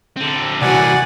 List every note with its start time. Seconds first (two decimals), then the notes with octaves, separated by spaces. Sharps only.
0.16 D3 C4
0.62 C2 E3 A#3 F#4 D5 F#5 G#5